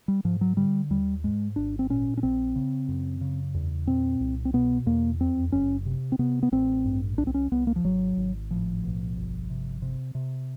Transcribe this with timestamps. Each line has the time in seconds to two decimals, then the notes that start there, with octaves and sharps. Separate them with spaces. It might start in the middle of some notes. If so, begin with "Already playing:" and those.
0.08 G3
0.25 G#2 F3
0.41 F#3
0.57 D3 G3
0.90 D#2 G3
1.24 G#2 G#3
1.56 G#1 D4
1.79 C4
1.90 A#2 C#4
2.17 C#4
2.23 A#1 C4
2.55 C#3
2.88 F#2
3.21 C#3
3.54 E2
3.87 A#2 C4
4.20 C2
4.45 C4
4.53 B2 B3
4.86 E2 A#3
5.20 F2 C4
5.52 F#1 C#4
5.86 C3
6.12 C4
6.19 C3 B3
6.43 B3
6.52 A1 C4
6.85 G2
7.18 C2 D4
7.27 C4
7.34 C#4
7.52 C2 B3
7.67 A#3
7.76 F3
7.84 G#1 F#3
8.17 G#1
8.50 A2 F3
8.84 B1
9.16 G1
9.50 C3
9.82 C3
10.15 C3